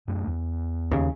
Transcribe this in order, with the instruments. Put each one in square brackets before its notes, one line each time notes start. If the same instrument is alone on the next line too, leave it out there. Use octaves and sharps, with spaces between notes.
[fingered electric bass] F#2 A3 D4
E2
[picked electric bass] D#2 C#3